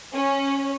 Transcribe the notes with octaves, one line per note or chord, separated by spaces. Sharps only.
C#4